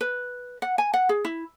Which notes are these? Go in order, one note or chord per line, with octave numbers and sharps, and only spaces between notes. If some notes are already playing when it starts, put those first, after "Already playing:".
B4
F#5
G#5
F#5
G#4
E4